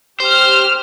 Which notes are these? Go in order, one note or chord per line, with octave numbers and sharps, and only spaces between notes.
G4 C5 F6